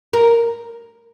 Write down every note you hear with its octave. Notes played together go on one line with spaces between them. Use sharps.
A#4